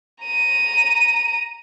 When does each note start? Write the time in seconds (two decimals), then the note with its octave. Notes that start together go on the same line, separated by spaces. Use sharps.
0.24 A#5 D#7